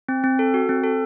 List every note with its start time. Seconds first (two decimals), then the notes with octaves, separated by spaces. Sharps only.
0.09 C4
0.24 C4
0.39 A4
0.54 F#4
0.69 C4
0.84 A4